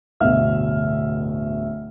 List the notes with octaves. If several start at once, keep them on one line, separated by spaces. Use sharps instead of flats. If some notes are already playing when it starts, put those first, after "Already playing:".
D1 G1 B2 E5 F6